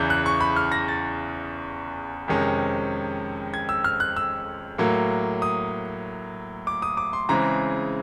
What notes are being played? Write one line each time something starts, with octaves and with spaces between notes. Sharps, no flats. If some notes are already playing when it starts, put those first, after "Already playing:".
Already playing: E2 C#3 E3 G6
F#6
C#6
B5
F6
A#6
A6
F2 C3 D#3 G#3 C#4
G#6
E6
F6
F#6
E6
A2 F#3 A#3
D#6
D6
D#6
D6
C6
C#3 E3 G#3 C4 A#5